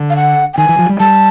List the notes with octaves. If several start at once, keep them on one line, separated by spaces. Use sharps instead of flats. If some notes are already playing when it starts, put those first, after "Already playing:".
Already playing: D3
F5
F#5
G5
D#3 G#5
E3
F3
G3
G3 A5